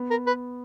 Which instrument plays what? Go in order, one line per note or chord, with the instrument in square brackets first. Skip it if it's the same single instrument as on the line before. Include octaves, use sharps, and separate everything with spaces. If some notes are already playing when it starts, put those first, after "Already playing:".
Already playing: [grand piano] B3
[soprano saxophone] A#4
B4